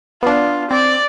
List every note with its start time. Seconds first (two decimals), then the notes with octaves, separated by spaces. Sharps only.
0.23 B3 D4 F4
0.71 C4 D5